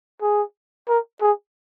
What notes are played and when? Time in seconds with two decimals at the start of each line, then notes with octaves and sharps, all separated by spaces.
0.22 G#4
0.88 A#4
1.21 G#4